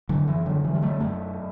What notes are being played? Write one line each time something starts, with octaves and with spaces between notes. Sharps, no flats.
D3 F#3
F#2 E3
D3 F#3
D3 E3 G3
G3
F#3 A3
F#2 F#3 A3